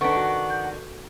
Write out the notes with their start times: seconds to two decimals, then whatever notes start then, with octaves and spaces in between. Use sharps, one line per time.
0.01 D#3 D4 A4 B4 F#5 C#6 B6
0.16 F#4
0.50 G6